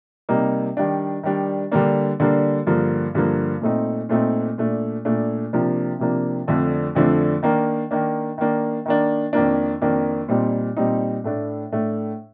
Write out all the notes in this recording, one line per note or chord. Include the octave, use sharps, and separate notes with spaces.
C3 G3 A#3 D#4
D#3 G3 D4
D#3 G3 D4
D3 G3 A#3 D4
D3 G3 A#3 D4
G2 D3 F3 A#3
G2 D3 F3 A#3
A#2 A3 C4 D#4
A#2 A3 C4 D#4
A#2 A3 D4
A#2 A3 D4
C3 F3 A#3 D4
C3 F3 A#3 D4
F2 D3 F3 A3 D4
F2 D3 F3 A3 D4
D#3 A#3 D4
D#3 A#3 D4
D#3 A#3 D4
D#3 A#3 D4
F2 D#3 A#3 D4
F2 D#3 A#3 D4
A#2 G3 C4 D#4
A#2 G3 C4 D#4
A2 A3 D4
A2 A3 D4